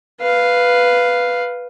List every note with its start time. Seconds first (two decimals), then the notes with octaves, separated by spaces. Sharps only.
0.21 B4 F5